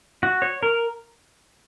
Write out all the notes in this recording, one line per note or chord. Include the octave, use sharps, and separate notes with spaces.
F#4
C#5
A#4